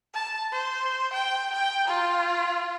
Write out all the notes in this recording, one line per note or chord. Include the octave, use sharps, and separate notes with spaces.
A5
C5
G5
G5
F4